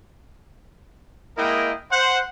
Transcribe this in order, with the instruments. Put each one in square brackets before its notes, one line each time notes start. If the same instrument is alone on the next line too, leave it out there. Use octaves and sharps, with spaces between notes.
[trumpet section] G#3 A#3 E4 A#4 D#5 G5
C5 F#5